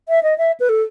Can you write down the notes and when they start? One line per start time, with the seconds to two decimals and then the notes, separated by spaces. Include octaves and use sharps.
0.09 E5
0.23 D#5
0.38 E5
0.60 B4
0.69 A4